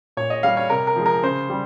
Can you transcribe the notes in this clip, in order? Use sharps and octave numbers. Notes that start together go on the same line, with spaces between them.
A#2 C#5
D#5
G3 F5
C#5
C3 A#4
A#4
F3 G#3
A#4
C#3 C5
G3